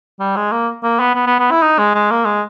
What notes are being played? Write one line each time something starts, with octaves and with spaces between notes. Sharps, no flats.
G3
G#3
A#3
A#3
B3
B3
B3
B3
E4
D#4
G#3
G#3
A#3
G#3